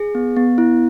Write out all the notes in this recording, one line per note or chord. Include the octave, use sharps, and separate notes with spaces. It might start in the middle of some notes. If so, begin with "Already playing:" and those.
Already playing: G#4
B3
B3
E4